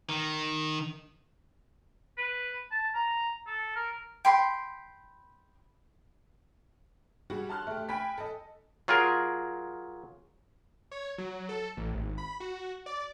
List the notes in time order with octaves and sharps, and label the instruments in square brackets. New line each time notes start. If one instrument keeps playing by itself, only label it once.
[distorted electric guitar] D#3
[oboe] B4
A5
A#5
A4
A#4
[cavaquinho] G5 B5 C6
[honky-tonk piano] G3 F#4 G#4
A5 C6 F6 F#6
A3 G4
G5 G#5 B5 B6
A4 D#5
[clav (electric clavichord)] F#3 F4 G#4 A#4
[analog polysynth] C#5
F#3
A4
A1
G#1
B5
F#4
D5